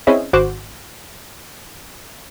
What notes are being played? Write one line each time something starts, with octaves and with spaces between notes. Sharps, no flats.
C4 C#4 E4 G#4 D#5 E5
G#1 F#4 C5 D6 F#6 E7